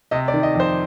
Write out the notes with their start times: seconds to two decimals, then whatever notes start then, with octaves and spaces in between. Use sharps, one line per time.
0.11 C3 D#5
0.28 D5
0.34 D#3
0.43 D#5
0.55 F2 C5